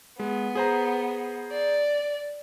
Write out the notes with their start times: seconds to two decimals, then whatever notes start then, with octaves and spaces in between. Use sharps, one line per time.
0.19 G#3 B3
0.55 G#4 C5 A#5
1.53 D5